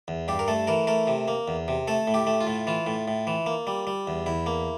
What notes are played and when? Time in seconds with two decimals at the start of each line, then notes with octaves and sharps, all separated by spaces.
0.08 E2
0.28 G2 G4
0.39 A#4
0.48 A3 A4
0.67 E3 A#4
0.87 A3 A#4
1.07 C3
1.28 A#3
1.48 E2
1.68 C3
1.88 A3 A4
2.07 A2
2.14 G4
2.27 A3
2.41 F4
2.47 A2
2.67 E3 F4
2.87 A2
3.08 A2
3.27 E3
3.46 A#3
3.67 G3
3.87 G3
4.07 E2
4.26 E2 E4
4.46 A#3